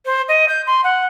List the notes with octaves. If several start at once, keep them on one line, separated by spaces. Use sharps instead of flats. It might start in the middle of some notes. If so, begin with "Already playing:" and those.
C5
D#5
G6
C6
F#5